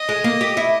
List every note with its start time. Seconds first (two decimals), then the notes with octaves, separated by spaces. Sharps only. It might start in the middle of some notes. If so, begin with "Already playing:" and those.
Already playing: D#5
0.09 G#3
0.24 A#3
0.41 G4
0.57 E4